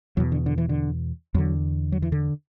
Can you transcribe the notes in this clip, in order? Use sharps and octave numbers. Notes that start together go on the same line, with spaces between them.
E2 B2 F#3
D3
D3
E3
D3
E2 D3 F#3
F#3
E3
D3